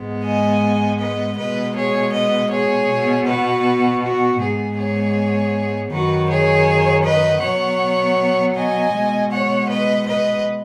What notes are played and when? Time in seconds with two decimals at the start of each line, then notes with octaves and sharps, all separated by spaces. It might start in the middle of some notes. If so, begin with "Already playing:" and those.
Already playing: G#2 G#3 B3
0.24 D#5 G#5
1.00 B4 D#5
1.37 B2 G#3 B3 B4 D#5
1.75 G#4 C#5
2.13 B4 D#5
2.51 G#4 C#5
2.88 B2 B3
3.26 F#4 B4
4.02 F#4
4.39 G#2 G#3 B3 G#4
4.77 G#4 C#5
5.91 F#2 D#3 F#3 F#4 B4
6.29 G#4 C#5
7.04 B4 D#5
7.41 B2 F#3 B3 C#5 F#5
8.55 D#5 G#5
8.93 B2 G#3 B3
9.31 C#5 F#5
9.68 B4 D#5
10.07 B4 D#5